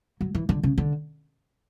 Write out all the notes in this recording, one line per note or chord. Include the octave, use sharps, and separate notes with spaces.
F#3
E3
D3
C#3
D3